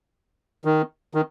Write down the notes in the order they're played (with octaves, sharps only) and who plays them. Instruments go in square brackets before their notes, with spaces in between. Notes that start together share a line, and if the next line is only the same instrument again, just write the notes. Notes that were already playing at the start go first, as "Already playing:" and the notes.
[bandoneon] D#3
D#3